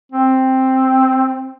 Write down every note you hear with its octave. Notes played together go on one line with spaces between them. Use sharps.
C4